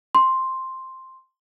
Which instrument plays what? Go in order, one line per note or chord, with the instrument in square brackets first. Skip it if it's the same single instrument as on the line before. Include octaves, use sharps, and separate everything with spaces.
[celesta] C6